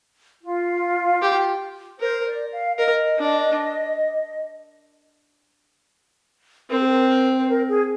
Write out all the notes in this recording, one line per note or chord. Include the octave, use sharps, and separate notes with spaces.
F4
G4
A#4 C5
D5
F5
A#4 D#5
D4
C4 A#4
G#4
A#4
C5
A#4
G#4